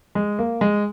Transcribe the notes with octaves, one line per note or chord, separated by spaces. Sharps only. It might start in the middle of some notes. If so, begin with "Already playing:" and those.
G#3
A#3
G#3